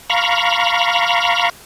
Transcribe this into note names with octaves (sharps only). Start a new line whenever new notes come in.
F5 A#5 B5 C#6